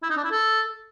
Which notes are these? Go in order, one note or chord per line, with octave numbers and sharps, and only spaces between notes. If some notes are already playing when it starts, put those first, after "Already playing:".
E4
D#4
D4
E4
A4